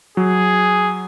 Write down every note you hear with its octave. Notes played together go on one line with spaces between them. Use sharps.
F#3 G#4